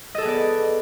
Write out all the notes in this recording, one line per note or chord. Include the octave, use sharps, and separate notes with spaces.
B3 G#4 A4 D5 D#5